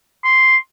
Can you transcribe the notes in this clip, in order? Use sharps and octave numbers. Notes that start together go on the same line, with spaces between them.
C6